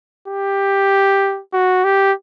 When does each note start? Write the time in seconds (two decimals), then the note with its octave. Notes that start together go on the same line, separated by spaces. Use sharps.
0.28 G4
1.53 F#4
1.84 G4